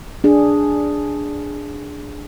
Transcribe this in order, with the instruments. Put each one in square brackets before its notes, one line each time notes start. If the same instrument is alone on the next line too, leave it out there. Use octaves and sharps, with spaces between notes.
[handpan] D4 G#4